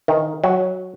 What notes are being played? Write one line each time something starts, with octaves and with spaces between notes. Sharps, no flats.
D#3
F#3